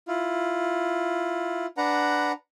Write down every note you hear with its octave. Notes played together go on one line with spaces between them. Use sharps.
E4 F4
D4 B4 F#5 A#5